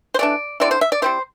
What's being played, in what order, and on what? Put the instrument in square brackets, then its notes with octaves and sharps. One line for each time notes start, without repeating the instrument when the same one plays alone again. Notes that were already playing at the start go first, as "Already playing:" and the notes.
[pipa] C5
E3 A3 D4 D5
D3 C4 E4 D5
C5
E5
D5
G3 C4 E4 C5